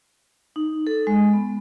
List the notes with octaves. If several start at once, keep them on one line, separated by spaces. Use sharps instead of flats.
D#4
A4
G#3
B3